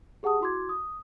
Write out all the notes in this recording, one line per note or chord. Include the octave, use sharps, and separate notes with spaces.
G4 G#4 F#5 A5 D#6
E4 F#4 C6 D6 G#6
D#6